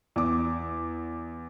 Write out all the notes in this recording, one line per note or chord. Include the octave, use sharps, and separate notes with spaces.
E2 D6